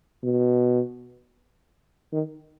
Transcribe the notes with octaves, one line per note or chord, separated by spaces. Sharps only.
B2
D#3